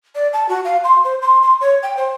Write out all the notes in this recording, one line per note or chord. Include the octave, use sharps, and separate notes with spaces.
D5
A5
F#4
F5
C6
C5
C6
C6
C#5
G5
C5